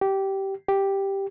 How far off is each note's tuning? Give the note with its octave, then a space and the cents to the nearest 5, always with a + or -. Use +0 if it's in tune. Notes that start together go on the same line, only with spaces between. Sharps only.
G4 -15
G4 +0